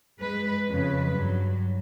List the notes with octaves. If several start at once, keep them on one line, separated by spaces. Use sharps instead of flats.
G#3 B4
F2 C#3 B4
G2 F#3